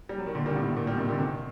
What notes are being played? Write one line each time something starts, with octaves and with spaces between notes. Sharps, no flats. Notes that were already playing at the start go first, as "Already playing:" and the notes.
G3
F#3
D#3
A#2 D3
D#3 G3
A2 C3
A2
A#2
D#3 G3
C3 D#3
A#2 D3
C3 D#3